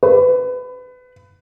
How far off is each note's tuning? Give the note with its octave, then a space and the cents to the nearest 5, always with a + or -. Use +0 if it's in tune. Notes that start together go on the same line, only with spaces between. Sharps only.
B4 +25